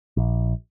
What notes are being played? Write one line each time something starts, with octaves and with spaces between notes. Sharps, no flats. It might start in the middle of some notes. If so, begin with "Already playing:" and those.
A#1